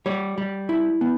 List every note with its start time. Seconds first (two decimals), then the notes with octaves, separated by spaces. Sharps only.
0.06 G3 C#5
0.38 G3
0.69 E4
1.01 B3